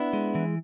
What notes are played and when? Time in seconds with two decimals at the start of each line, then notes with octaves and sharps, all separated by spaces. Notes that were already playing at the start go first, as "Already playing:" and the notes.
Already playing: B3 D4 E4
0.13 G#3
0.35 E3